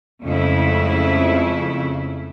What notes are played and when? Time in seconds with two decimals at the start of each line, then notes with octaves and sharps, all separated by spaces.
0.24 F2 C#3 G#3 A3 E4